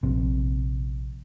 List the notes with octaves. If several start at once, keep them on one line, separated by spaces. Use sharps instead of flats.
A#1 C3